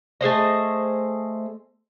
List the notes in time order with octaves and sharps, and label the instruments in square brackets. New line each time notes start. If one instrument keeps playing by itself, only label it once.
[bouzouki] A3 G#4 C5 D#5